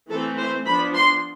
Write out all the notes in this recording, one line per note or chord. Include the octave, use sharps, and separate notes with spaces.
E3 A3 C4 A4
C5
F3 B3 D4 B5
C6